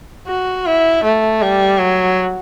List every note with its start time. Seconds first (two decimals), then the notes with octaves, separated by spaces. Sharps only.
0.27 F#4
0.66 E4
1.04 A3
1.42 G3
1.80 F#3